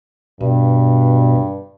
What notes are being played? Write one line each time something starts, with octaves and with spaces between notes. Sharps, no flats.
G2 B2